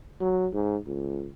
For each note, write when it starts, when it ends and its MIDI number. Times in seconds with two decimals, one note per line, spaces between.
0.21 0.47 54
0.53 0.77 44
0.87 1.28 37